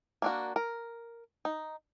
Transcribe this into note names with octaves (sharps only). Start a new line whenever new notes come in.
A#3 D4 F#4
A#4
D#4